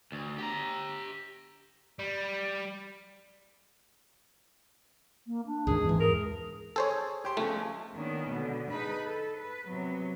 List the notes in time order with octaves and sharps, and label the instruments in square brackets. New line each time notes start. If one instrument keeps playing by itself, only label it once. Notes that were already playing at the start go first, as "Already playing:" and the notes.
[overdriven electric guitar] D2
G4 A#5
G3
[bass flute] A#3
D4
[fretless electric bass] C#2 G#2 D#3 [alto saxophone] G#4
[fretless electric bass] E2 G#2 [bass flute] E3
[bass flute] G#4 [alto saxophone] A#4
[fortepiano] G#4 [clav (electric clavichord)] A4 C5 C#5
[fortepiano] G4 C5
[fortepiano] C#2 C#3 F3 [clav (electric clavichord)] A3
[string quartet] D#3 A#3 B3 C#4 D4
B2 D3
D#4 G#4 B4 A5 B5
A4
B4
C3 F#3 B3